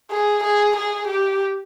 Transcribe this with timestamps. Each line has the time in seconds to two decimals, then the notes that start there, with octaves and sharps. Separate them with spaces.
0.11 G#4
0.44 G#4
0.76 G#4
1.07 G4